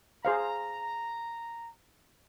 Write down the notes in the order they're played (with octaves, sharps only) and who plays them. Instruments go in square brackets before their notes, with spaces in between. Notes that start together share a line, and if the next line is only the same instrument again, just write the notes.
[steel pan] G#4 C5 F5 [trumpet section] A#5